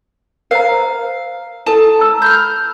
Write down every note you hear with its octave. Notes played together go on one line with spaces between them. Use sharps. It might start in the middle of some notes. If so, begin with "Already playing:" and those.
A#4 C5 F5 A#5
E4 A4 A5
A#5 E6
B5 F6 G6